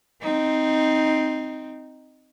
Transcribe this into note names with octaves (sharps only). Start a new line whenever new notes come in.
C4 D#4